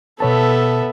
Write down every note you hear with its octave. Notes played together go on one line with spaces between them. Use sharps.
B2 B3 A4 C#5 E5 A5